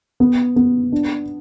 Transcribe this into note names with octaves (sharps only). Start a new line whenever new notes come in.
B3
B3
D4